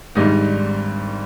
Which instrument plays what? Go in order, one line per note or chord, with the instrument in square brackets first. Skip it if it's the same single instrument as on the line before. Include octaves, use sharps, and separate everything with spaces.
[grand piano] G#1 G#2 G3 D4 D#4